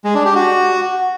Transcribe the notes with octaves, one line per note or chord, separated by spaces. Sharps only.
G#3
D4
G4
F#4